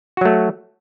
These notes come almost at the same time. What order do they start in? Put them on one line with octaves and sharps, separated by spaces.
F#4 F#3 A3